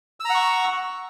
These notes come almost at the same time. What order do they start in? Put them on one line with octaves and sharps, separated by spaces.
E6 A#5 F#5 C#6